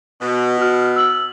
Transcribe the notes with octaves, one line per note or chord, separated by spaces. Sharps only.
B2
F#4 F6
E6 F#7